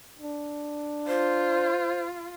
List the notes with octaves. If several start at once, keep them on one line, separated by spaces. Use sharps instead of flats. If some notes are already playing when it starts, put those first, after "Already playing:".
D4
F4 C5